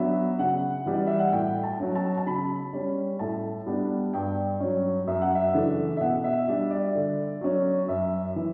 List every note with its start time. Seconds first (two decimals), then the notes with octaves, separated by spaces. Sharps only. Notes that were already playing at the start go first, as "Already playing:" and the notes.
Already playing: F#3 B3 D4 E5
0.39 C#3 F#5
0.86 E3 G3
0.94 D5
1.07 E5
1.19 F#5
1.32 A2 G5
1.63 A5
1.80 F#3 C#4
1.95 A5
2.17 A5
2.26 C#3 B5
2.73 G3 C#4
3.19 A2 A5
3.67 G3 B3 D4
4.13 G2 G5
4.60 F#3 C#4
5.07 F#2 E5
5.22 F#5
5.35 E5
5.54 C#3 E3 A3 D4
5.97 E5
6.00 B2 F#5
6.24 E5
6.48 G3 D4 E5
6.71 D5
6.95 D3
7.41 F#3 C#4
7.88 F#2 E5
8.36 E3